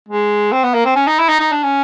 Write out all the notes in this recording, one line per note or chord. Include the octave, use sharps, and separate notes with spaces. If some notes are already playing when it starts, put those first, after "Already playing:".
G#3
C4
B3
A#3
C4
C#4
D#4
E4
D#4
D#4
D4
C#4